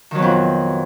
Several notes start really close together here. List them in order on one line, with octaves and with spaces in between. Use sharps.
D#3 F#3 B2 F2